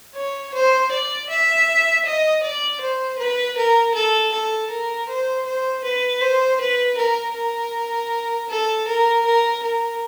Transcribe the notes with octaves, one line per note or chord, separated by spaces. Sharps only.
C#5
C5
D5
E5
D#5
D5
C5
B4
A#4
A4
A4
A#4
C5
C5
B4
C5
B4
A#4
A#4
A4
A#4
A#4
A#4